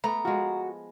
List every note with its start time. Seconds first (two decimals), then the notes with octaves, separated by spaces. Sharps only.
0.04 A3 B3 A#5
0.25 F3 G#3 F#4